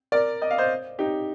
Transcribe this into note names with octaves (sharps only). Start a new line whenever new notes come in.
A#4 D5
D#5
F5
C5 D#5
D#4 G4